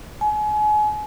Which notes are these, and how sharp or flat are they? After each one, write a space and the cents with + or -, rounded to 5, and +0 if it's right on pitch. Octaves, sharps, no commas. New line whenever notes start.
G#5 +35